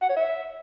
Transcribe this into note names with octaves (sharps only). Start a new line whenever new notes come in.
F#5
C#5
E5